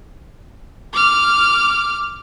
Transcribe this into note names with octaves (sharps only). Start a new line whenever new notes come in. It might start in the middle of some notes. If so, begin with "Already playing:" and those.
D6 F6